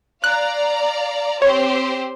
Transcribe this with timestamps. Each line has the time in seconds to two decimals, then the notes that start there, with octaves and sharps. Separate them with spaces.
0.24 D5 F5 A#5 F#6
1.42 C4 G4 C5 C#5